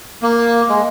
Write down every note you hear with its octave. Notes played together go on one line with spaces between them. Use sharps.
A#3
G#3